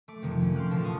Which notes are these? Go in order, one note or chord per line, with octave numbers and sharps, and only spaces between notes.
A3 D6
F2 C3 D#3 F3
F#3 C4 C#4
C6 D6 F6 F#6
A1 A#2 D3 F4 A5 A6
C#6 D#6